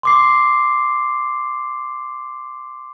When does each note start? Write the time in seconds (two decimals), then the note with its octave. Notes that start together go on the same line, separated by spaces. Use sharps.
0.03 C6 D6 C7